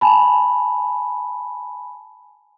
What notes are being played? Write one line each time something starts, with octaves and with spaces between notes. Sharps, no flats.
G#5 A5 B5